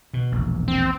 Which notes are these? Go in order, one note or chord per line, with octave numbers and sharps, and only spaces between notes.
B2
E1 A#1
C4